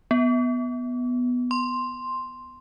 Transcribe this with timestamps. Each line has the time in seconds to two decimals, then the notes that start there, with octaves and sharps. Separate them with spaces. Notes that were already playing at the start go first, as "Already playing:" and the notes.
0.11 B3
1.51 C6